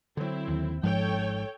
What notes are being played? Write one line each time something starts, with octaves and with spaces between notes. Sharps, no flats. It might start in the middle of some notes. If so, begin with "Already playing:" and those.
D3 F#3 C4 E4
D#2
G#1 G#2 F3 A4 C#5 G5